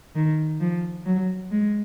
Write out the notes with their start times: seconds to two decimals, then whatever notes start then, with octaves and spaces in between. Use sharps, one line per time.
0.15 D#3
0.60 F3
1.06 F#3
1.51 G#3